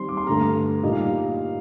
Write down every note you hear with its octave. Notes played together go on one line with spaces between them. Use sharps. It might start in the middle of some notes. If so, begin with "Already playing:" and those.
Already playing: D#3 G3 C4 C6
D6
C6
G2 D3 A3 A#5
A#2 G3 A#3 D#4 D#5
F5